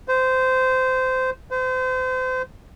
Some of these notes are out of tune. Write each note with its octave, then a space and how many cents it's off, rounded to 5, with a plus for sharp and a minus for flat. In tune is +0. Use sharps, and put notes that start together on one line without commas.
C5 -20
C5 -35